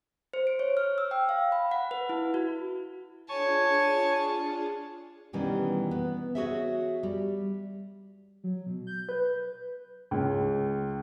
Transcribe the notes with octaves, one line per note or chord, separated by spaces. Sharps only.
C5
D7
C#5
F6
E6
G5
F5
B5
F#5
B4
E4
F#4
D4 F4 G#4 C#5 G#5 A5 C#6
B2 D#3 E3 G3 C#4
B3
F#4 G#4 C#5 D#5 E5
G3
F#3
B2
G6
B4
C#2